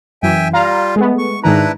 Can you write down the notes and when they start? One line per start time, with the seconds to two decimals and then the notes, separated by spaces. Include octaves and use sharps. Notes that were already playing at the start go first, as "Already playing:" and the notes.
0.23 F#2 E3 E5 G5 G#5
0.53 G3 F4 F5 A#5
0.96 G#3 A3 B3
1.18 C#6
1.44 G#2 D#3 D4 E4 B4 A#5